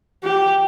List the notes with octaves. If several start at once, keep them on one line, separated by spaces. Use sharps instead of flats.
G4